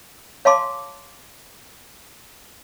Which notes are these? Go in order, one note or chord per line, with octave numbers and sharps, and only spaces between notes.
C#5 F5 G#5 A5 C6 D6